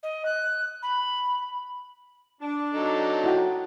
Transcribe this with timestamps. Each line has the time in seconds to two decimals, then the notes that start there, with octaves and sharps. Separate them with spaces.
0.03 D#5
0.25 F#6
0.82 B5
2.41 D4
2.74 F#3 D#4 A4
3.24 E4 F#4 G5